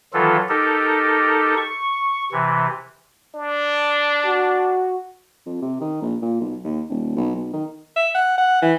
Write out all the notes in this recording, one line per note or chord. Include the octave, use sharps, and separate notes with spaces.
D#3 E3 F#3 F4 A4
D#4 G4 A4 A#4
C#6
C3 E3
D4
F#4
F2
C3
D#3
A#1
A#2
B1
D#2
D#1
B1
B1
D#3
E5
F#5
F#5
E3